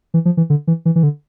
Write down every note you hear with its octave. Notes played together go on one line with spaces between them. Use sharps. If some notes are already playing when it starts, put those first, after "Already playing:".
E3
F3
E3
D3
E3
E3
E3
D3